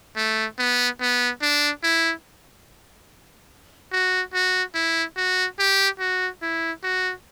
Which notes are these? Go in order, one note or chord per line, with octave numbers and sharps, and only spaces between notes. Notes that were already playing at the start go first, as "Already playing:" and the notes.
A3
B3
B3
D4
E4
F#4
F#4
E4
F#4
G4
F#4
E4
F#4